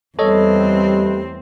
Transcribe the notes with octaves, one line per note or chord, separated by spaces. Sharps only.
E2 G3 A3 C4 A4 B4 C#5 D#5